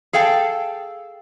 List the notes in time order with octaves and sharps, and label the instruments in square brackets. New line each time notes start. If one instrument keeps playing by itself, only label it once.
[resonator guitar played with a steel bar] G#4 A4 F5 G5 A5